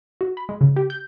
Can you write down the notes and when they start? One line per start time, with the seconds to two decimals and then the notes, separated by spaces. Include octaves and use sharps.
0.21 F#4
0.37 B5
0.49 G#3
0.61 C#3
0.76 G4
0.90 G6